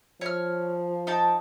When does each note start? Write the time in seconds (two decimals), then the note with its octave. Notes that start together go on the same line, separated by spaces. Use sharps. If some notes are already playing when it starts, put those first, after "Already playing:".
0.21 F3 C#5 F6
1.07 D#4 G5 A5